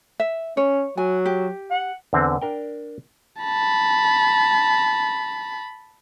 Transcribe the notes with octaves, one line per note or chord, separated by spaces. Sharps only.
E5
C#4 C#5
F#3 G#5
G4
F#5
E2 D3 C4
D4 A#4 G5
A5 B5